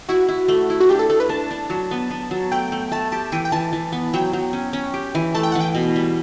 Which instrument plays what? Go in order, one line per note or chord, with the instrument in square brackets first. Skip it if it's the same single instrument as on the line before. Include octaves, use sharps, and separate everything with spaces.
[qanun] E4 [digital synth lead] F#4
[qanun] E4
A3
E4
[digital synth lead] F#4
[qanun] D4 [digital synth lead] G4
[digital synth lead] A4
[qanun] A3 [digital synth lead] A4
[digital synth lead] B4
[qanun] D4 [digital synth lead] A5
[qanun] D4
F#3
B3
B3
F#3
[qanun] A3 [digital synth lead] G5
[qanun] A3
[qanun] A3 [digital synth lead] A5
[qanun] G4 [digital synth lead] A5
[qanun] E3 [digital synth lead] G5
[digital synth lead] G5
[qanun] E3 [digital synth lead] A5
[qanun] E3
B3
[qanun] F#3 [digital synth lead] G5
[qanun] F#3
C#4
C#4
G4
E3
[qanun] A3 [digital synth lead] A5
[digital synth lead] G5
[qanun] E3 [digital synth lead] F#5
[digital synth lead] G5
[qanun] B2
G3